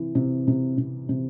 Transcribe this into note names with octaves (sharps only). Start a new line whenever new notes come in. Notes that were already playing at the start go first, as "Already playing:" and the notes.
Already playing: C3 E3
C3
C3
C3
C3